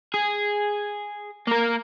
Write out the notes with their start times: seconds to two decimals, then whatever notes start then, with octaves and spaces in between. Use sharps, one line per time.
0.14 G#4
1.47 A#3 A#4